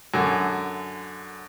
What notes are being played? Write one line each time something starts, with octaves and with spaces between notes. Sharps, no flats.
F#2 D3 G#5